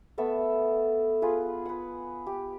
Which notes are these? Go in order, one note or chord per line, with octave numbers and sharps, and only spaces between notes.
A3 B3 A4 E5
F4 G#4 B4
B4 F#5
G4